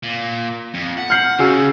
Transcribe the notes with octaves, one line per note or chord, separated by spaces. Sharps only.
A#2
F2
F#5
F6 G6 C7
C#3 F#4 G#4 E6